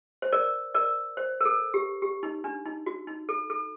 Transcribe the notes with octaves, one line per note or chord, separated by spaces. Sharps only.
C5
A#4 D5
A#4 D5
C5
A#4
A4
G4
G4
D#4
D4
D#4
F#4
D#4
A4
A4